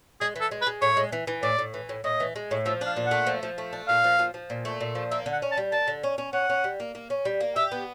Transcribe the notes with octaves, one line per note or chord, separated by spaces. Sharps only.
G#3 G#4
E3
A4
G#3
B4
G#3
A2 C#5
G#3
E3
E3
A2 D5
A2
E3
A2
A2 D#5
E3
G#3
A2
F3 E5
D4 F5
A#2
A3 F#5
F3
F3
A3
D4
A#2 F5
F3
F3
F3
A#2
A3
A#2
F3
A#3 E5
D3
F#5
C#4
A5
G3
A#3 A5
D3
C#4
C#4
C#4 F#5
C#4
G3
A#3
A#3
C#4
G3
A#3
G4 E5
B3